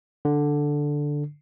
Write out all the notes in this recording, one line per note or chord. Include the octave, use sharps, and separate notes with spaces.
D3